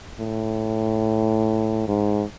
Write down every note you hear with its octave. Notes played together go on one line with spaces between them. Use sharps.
A2
G#2